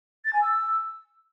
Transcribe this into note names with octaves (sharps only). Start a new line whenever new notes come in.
A6
G#5
E6